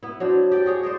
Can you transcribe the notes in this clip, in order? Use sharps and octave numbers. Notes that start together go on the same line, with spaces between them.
B3 E4
F#3 D4 C5
G4 D5
F#4 G#4 C#5
C5 D5 D#5